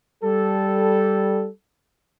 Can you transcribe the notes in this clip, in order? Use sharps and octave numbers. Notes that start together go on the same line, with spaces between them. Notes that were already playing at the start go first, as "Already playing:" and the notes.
G3 A4